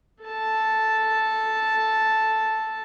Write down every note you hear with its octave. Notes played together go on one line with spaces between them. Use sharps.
A4 A5